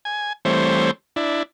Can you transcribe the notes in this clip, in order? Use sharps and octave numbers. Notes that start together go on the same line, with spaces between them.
G#5
E3 G3 A3 C4 C5 C#5
D4 E4